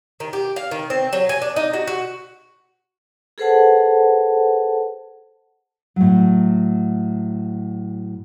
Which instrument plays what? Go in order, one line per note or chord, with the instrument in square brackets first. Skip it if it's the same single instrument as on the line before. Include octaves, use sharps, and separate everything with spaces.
[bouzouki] D#3
G4
F5
D#3
C4
F#3
G#5
D4
D#4
F#4
F#4
[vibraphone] G#4 A4 B4 C5 F#5 A5
[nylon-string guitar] A2 F#3